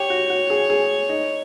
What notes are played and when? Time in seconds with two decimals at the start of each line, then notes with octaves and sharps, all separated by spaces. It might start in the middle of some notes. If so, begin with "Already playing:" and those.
Already playing: G4 C#5
0.10 F#4
0.30 F#4
0.50 G#4
0.70 G#4
1.09 D#4